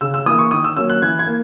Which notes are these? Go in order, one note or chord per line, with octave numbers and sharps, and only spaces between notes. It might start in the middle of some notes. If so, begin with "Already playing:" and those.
C#3 E6
E6
E3 A#3 D#6
C#6
D#3 D#6
E6
F#3 A#3 C#4 E6
F#6
E3 G#6
G#6
A#3